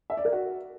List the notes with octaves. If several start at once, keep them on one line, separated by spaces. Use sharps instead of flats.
E5
D5
A#4
F#4